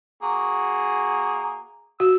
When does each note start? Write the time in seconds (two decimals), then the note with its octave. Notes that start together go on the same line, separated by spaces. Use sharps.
0.23 A#3 F#4 G#4
2.00 F#4 E6